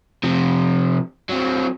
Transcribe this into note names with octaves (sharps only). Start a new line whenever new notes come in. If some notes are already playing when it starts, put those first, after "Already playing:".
C3 F3
F#3 C4